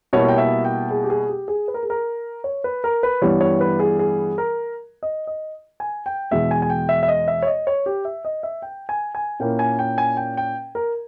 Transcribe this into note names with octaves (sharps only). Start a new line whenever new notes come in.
B2 G3 A#3 E4 C#5
G5
E5
G5
G#4
G4
G#4
G4
G#4
B4
A#4
G#4
A#4
C#5
B4
A#4
B4
G2 E3 G3 B3 E4 C#5
C#5
B4
G#4
G#4
A#4
D#5
D#5
G#5
G5
E2 B2 G#3 E5
G#5
G#5
G5
E5
E5
D#5
E5
C#5
D#5
C#5
G4
E5
D#5
E5
G5
G#5
G#5
A#2 A#3 C#4 E4 G5
G#5
G5
G#5
G5
G5
A#4